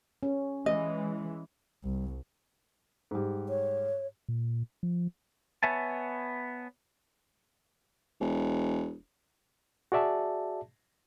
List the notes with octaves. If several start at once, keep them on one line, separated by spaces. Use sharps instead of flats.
C#4
E3 G#3 D#5
C2
G#2 G3
C#5
A#2
F3
B3 C#5 E5 G#5 A5
E1
F#4 G#4 D5 E5 A5